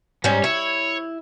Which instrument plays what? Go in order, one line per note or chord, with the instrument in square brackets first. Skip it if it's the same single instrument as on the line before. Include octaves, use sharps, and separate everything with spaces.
[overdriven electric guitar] G#2 [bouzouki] G3 C#4
[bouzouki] E4 [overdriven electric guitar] C#5